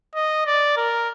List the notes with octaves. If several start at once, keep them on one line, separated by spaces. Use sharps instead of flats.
D#5
D5
A#4